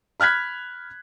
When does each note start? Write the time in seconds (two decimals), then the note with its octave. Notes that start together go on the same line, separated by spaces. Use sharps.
0.20 B5 F6 F#6 G#6 B6